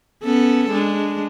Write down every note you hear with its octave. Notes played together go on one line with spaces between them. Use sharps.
B3 C#4 A4
G#3 D4